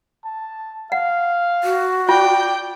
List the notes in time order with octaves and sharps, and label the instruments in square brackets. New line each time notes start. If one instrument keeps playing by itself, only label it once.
[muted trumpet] A5
[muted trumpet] F5 [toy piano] F#5
[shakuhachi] F#4
[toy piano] F4 [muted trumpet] D5 [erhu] G5